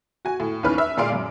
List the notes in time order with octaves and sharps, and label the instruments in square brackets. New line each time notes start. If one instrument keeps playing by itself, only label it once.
[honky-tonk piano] F#4 G#5
A2
D#2 E3 C#4 B4 F6
B4 E5
A#2 G#3 D5 F5 C6 D7
F#2